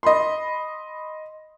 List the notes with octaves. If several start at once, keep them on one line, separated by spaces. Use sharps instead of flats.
D#5 B5 C6